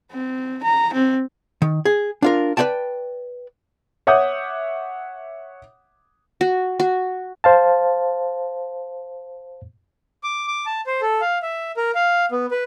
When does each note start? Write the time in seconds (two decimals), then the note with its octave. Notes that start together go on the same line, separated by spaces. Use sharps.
0.12 C4
0.64 A#5
0.94 C4
1.62 D#3
1.85 G#4
2.22 D4 F4 A#4
2.57 B4 C5 D5 G5 A5
4.07 C#5 E5 F#5 D6 D#6 G6
6.41 F#4
6.80 F#4
7.44 C5 F5 A5
10.23 D6
10.48 D6
10.66 A5
10.87 C5
11.01 A4
11.21 F5
11.43 E5
11.77 A#4
11.95 F5
12.32 B3
12.51 B4